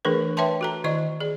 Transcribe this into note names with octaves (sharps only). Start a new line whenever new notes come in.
E3 A3 D4 G#4 A#4 B4
B4 C#5 E5 G5 A5 C6
F#4 A4 A#5
D#3 E4 D5 D#5 C#6
G#4 D5